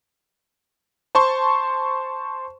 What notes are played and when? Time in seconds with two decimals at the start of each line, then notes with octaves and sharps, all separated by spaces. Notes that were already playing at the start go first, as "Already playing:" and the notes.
1.15 C5 A5 C6 C#6